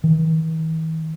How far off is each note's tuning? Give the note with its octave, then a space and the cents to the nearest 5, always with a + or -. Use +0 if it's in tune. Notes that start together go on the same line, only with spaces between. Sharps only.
E3 -45